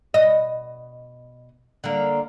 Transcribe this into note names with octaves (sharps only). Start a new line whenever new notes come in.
B2 D#5
D3 A#3